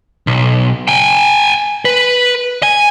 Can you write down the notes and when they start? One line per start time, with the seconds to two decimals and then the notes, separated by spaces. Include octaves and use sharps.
0.27 B1
0.88 G5 G#5
1.85 B4
2.63 G#5